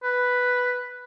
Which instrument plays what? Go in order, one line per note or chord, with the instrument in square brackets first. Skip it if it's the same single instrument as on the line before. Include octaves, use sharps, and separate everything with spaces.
[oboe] B4